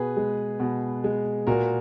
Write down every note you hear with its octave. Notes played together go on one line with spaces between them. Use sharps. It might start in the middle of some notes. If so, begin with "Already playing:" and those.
Already playing: B2 G#4 B4
G#3
B2
G#3
A#2 F#4 A#4